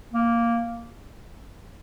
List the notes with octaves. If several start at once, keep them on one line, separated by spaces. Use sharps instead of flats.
A#3